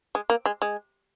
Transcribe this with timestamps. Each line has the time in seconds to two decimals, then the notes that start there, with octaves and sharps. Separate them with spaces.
0.15 G#3
0.30 A#3
0.46 G#3
0.62 G#3